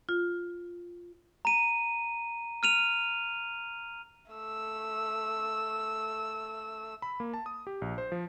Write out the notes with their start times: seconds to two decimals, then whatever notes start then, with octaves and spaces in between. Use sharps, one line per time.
0.09 F4
1.45 A#5 D#7
2.63 F6 D#7 F7
4.32 A3 E6
7.02 B5
7.20 A#3
7.34 A5
7.46 D#6
7.67 G4
7.82 A#1
7.98 C5
8.12 F3